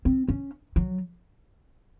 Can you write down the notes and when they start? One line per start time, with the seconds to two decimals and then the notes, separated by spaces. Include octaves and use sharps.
0.05 C4
0.28 C#4
0.76 F#3